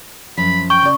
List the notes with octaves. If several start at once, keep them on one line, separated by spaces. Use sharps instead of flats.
F#2 F3 B5
G5 C#6
C#3 D5